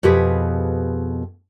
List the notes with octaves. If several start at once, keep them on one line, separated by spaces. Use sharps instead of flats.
F2 B2 G4 G#4 B4